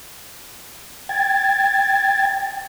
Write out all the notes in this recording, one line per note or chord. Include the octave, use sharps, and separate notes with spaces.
G5 G#6 A6